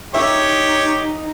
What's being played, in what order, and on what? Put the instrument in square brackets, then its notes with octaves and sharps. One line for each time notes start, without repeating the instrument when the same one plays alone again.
[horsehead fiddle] D#4 [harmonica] G4 C#5 [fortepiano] E5